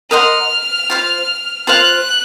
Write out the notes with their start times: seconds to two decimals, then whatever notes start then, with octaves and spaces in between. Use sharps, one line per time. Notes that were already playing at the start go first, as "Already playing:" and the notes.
0.11 A#4 D#5 F#5 C6 F6
0.90 F4 C5 F5
1.67 F4 C5 F5 F#6